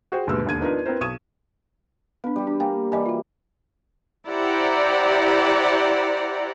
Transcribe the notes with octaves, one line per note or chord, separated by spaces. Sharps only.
F#4 G#4 C5 G5
G1 D#2 G#2 B2 B3 E6
E1 D#2 D3 G#6 D#7
B3 D4 D#4 F4 A#4 B4
B3 C4 E4 A#4 C5
B1 C#6 D#6 G#6 D#7 E7
B3 D4 B4
G3 G4
D4
A#3 G5 G#5
E3 G3 D5 D#5 G#5
F4 F#4
E4 G4 C5 D5 F#5 A#5